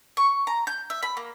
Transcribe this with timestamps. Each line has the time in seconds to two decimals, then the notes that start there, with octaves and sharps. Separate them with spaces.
0.17 C#6
0.47 A#5
0.67 G6
0.90 E5
1.03 B5
1.17 A#3